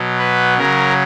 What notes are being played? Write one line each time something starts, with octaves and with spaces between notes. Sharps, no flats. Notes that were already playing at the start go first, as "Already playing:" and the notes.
Already playing: B2 F#3
B4
C#3 F#3 A#4